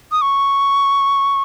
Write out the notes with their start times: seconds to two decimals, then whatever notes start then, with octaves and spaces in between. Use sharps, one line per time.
0.12 D#6
0.22 C#6